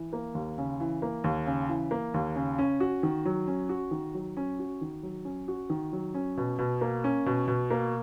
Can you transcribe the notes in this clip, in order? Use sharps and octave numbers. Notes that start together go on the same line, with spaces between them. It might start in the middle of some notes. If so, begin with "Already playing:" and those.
Already playing: E3
A#3
D#2
C#3
E3
A#3
D#2
C#3
E3
A#3
D#2
C#3
C#4
F#4
D#3
F#3
C#4
F#4
D#3
F#3
C#4
F#4
D#3
F#3
C#4
F#4
D#3
F#3
C#4
B2
B2
A#3
C#4
B2
B2
A#3